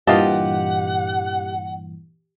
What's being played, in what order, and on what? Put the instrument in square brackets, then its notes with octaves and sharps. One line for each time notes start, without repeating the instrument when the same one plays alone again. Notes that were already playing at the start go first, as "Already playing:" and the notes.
[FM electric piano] G2 A#2 E3 [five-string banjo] F4 D#5 A5 [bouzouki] G4 [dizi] F#5